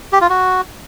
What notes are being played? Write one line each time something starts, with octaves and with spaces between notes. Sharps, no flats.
G4
F4
F#4